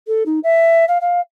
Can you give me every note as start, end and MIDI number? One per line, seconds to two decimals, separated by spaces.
0.07 0.23 69
0.26 0.39 63
0.43 0.85 76
0.88 0.98 77
1.01 1.20 77